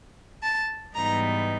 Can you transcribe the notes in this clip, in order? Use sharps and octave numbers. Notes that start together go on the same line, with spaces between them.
A5
G#2 E3 G3 B3 D#4 A#5